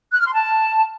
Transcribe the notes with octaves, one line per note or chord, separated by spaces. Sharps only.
F#6
F6
C6
A5